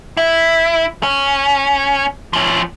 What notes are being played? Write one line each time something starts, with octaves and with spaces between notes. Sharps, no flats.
E4
C#4
F3 C#4